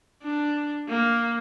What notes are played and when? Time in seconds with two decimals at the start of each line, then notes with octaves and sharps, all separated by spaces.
0.22 D4
0.88 A#3